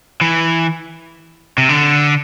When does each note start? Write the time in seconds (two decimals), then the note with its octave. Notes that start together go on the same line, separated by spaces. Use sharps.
0.21 E3
1.58 C3
1.69 D3